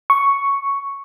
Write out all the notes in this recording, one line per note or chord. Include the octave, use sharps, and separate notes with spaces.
C#6